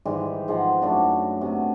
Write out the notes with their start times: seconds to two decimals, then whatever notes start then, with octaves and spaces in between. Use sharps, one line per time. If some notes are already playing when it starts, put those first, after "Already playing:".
0.05 G#2 D#3 E3 G3
0.48 G#2 F3 G#3 F#5
0.81 F#2 A3 D4 F#4
1.41 C3 A3 B3